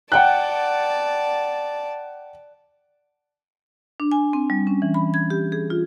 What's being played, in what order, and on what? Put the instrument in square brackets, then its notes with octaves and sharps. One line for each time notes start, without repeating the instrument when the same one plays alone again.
[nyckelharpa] D5 A5 [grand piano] F#5 G5 F#6
[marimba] D4
G#5
C4
G3
C#4
E3
B5
G#6
G4
G#4
F4